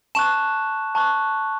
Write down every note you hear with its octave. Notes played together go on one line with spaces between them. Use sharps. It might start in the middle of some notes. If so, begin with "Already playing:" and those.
A5 C#6 F#6 E7
A5 C#6 F#6